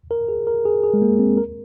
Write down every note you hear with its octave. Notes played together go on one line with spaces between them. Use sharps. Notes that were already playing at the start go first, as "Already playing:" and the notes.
A#4
G#4
A#4
G#4
G#4
G#3
A#3
C4
A#4